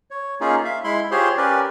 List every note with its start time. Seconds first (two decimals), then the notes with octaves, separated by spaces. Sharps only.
0.11 C#5
0.41 A#3 C#4 D#4 F4 G#4
0.65 E5 F5
0.84 G#3 E4 B5 C6
1.11 F4 G4 G#4 C5 C#5 C6
1.37 C#4 G4 A#4 B4 D5